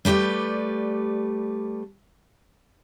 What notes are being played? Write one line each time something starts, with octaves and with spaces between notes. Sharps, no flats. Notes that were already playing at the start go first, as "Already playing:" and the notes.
G3 A3 G4 B4 D5